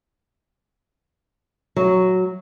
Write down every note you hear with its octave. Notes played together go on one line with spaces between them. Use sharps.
F#3